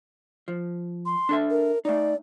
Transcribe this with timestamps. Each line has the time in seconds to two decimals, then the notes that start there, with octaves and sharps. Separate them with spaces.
0.48 F3
1.06 C6
1.29 D4 A4 E5
1.50 A#4
1.85 A3 D#4 D5